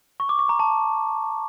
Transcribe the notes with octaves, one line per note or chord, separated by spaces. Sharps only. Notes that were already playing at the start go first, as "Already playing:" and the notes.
C#6
D6
C#6
A#5
A5